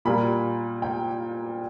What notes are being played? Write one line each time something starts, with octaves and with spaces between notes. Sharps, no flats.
A#2 G3 A#3 B5
G5